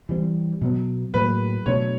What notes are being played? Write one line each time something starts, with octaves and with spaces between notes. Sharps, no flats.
E3 G3 C4
B2 F#3 B3
A2 F#3 A#3 B4
B2 F#3 A3 D4 C#5